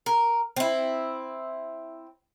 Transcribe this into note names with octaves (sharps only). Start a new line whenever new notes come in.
A#4
C4 E4